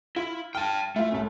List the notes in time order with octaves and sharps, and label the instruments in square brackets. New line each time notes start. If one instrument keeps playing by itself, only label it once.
[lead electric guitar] E4 [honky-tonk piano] F4
[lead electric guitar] G5 A5 [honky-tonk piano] F6
[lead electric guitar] A3 [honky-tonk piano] E4 F4
[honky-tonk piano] C2 A2 C#4